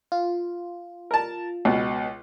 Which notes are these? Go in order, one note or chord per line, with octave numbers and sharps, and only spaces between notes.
F4
A#4 A5
C#2 B2